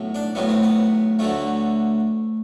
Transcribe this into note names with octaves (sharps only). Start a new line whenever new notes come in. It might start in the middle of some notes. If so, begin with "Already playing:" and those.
Already playing: B1 A2 F#3
D4
B1 A2 F#3 B3
C4
B3
D2 D3 F#3 A3